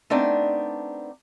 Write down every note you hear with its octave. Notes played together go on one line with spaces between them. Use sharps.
A3 B3 C4 D4 D#4 D5